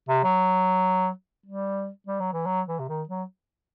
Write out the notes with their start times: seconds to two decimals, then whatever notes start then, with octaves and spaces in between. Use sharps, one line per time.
0.09 C3
0.23 F#3
1.46 G3
2.07 G3
2.20 F#3
2.33 E3
2.46 F#3
2.68 E3
2.79 C3
2.88 D#3
3.09 F#3